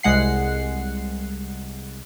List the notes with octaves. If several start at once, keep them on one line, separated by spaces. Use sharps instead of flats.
C2 G#3 F#5 C7